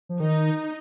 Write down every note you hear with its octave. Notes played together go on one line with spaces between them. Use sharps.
F3
D#3 D#4